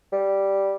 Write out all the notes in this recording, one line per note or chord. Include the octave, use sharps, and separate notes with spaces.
G3